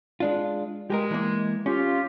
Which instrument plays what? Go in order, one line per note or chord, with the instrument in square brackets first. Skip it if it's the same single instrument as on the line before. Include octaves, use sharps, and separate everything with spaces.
[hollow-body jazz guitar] G#3 D4 F4
[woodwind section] G#3 [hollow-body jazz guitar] G4 G#4 A#4
[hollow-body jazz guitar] E3 A#3
[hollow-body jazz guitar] C#4 [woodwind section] F4 G4